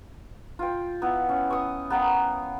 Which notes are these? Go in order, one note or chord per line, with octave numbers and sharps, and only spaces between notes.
F4 G5
B3 E4
C#4
C#6 D#6
B3 A#4 F5 G5